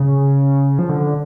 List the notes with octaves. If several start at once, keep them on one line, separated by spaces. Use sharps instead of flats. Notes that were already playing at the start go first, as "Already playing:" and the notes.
Already playing: C#3
F3
D3